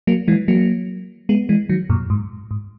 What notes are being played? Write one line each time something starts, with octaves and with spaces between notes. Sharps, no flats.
F#3 A#3
E3 G#3
F#3 A#3
G#3 B3
E3 G#3
D#3 F#3
F#2 A#2
G#2
G#2